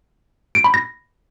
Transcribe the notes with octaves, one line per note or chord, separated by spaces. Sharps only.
D7
B5
A#6